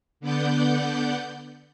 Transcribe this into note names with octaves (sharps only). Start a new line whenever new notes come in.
D3 B3 D5 F#5 G6